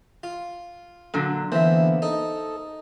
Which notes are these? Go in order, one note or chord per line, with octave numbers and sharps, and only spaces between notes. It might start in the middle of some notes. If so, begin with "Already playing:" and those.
F4
A#2 D3 F#3
D3 E3 A#3 B3 C5 E5
D#4 A4